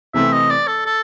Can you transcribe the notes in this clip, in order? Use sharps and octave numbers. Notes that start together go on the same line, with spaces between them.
C3 E3 A3 C4 E5
D#5
D5
A4
A4